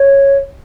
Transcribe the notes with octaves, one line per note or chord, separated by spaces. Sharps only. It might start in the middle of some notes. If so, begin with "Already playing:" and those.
Already playing: C#5